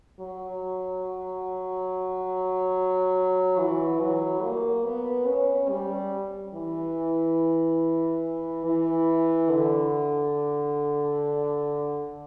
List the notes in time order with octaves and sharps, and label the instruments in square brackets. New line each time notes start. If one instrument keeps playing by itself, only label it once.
[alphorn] F#3
E3
F#3
A#3
B3
C#4
G3
E3
E3
D3